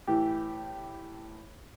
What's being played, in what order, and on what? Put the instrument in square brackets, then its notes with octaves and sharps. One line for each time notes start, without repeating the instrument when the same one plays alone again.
[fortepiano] A2 E3 G4